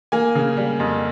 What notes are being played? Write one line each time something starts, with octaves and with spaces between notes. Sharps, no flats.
A#3 G#5
C#3
G3
F2